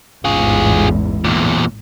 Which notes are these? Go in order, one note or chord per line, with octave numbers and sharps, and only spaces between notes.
A1 E2 G#2 F4 G#4
E2 A#2